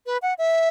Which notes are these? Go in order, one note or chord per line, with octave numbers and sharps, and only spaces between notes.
B4
F#5
E5